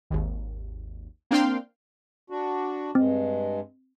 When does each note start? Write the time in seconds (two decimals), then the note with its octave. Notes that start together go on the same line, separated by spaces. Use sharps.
0.10 G#1 D#2
1.31 A#3 C4 D4 F5 G5 C6
2.30 D4 F#4
2.95 G2 G#3 C4